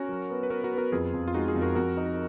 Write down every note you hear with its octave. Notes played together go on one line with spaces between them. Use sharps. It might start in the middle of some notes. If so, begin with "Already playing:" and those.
Already playing: C#4 F#4 A#4
F#3
B3
B4
B3 F#4 A#4
F#4 A#4
B3
F#4 A#4
F2 F4 G#4
F2
F4
G#3 D#4 F#4
F4 G#4
F2
F#4 A#4
F2 F#4 A#4
D#4